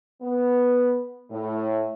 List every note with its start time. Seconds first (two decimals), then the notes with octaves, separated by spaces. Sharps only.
0.22 B3
1.30 A2